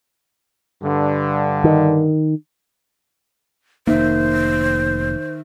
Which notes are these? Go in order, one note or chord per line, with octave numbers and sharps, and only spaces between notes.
G2 D3
D#3
F1 D#3 A#3 C5 E5